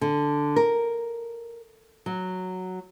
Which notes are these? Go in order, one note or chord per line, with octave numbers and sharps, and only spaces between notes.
D3
A#4
F#3